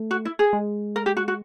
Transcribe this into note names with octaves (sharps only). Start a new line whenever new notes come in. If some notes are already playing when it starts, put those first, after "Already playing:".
Already playing: A3
F#4
E4
G#4
G#3
A#4
G4
F#4
F#4